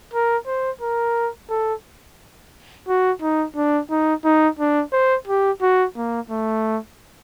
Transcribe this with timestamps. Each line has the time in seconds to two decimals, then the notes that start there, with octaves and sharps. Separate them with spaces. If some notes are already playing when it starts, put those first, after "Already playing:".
0.13 A#4
0.47 C5
0.81 A#4
1.50 A4
2.88 F#4
3.22 D#4
3.56 D4
3.90 D#4
4.24 D#4
4.59 D4
4.92 C5
5.27 G4
5.62 F#4
5.96 A#3
6.30 A3